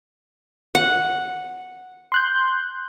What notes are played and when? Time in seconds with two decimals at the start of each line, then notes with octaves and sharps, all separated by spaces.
0.75 F#5
2.12 C6 F#6 G6